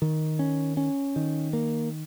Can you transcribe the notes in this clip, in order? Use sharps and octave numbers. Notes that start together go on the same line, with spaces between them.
D#3
C#4
C#4
D#3
A#3